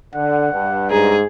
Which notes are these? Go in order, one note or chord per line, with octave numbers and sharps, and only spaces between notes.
D3 F#5
G2
G#2 G#4 A#5